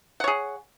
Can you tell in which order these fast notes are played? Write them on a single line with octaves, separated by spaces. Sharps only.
F#5 C#5 G#4